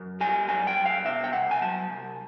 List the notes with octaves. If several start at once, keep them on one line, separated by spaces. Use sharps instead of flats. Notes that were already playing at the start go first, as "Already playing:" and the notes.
Already playing: F#2
G3 G#5
F#2 G#5
G5
F#2
F5
B2 E5
G5
C2 F#5
G#5
F#3 A5
C2